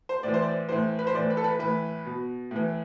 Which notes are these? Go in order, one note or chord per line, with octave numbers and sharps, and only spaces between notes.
C5
A2 E3 D5
C5
D5
A2 E3 C5
B4
C5
A2 E3 D5
B4
A4
B4
A2 E3 B4
B2
A2 E3